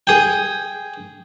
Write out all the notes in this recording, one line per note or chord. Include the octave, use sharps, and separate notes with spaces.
G#4 G5